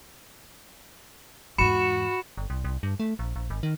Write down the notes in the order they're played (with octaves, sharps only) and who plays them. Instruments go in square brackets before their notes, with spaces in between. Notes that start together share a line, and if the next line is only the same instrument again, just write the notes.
[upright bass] E2 G#2 [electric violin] F#4 [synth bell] B5 C#7 E7
[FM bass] G1
C2
C2
G2
A3
A#1
A#1
G#1
D#3